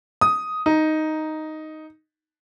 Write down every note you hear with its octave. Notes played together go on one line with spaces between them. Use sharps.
D#6
D#4